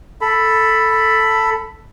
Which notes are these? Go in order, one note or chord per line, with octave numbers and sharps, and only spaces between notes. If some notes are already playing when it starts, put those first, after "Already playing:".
A4 B5